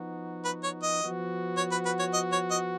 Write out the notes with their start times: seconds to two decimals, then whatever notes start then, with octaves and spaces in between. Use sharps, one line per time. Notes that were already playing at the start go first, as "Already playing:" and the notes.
Already playing: F3 B3 D#4 F#4
0.45 B4
0.64 C#5
0.83 D#5
1.02 F3 B3 F#4
1.57 C#5
1.72 B4
1.86 B4
1.99 C#5
2.14 D#5
2.32 C#5
2.51 D#5